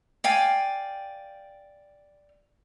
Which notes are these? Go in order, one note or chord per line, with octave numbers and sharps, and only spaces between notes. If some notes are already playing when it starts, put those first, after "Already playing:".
D5 F5 G5 G#5